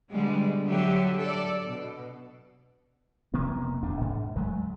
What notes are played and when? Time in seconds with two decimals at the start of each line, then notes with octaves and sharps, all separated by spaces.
0.12 B2 D3 G3 G#3
0.66 D3 F#3 G4 E5
1.19 A4 D5
1.65 B2
3.34 F1 C3 A#3 B3
3.83 D1 D2 D4
4.01 G#2
4.36 D2 F#3 G#3 A3